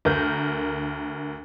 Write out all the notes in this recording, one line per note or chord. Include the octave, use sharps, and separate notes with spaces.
D2 A#4 G6